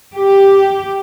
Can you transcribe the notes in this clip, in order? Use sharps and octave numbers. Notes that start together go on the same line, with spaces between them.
G4